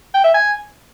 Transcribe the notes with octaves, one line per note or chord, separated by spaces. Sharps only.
G5
E5
G#5